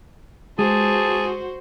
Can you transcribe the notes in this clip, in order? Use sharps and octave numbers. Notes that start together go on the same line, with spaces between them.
G#3 F#4 G#4 C5 A5